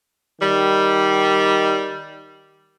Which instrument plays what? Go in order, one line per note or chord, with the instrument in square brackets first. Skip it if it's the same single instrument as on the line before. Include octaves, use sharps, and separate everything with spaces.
[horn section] D#3 G3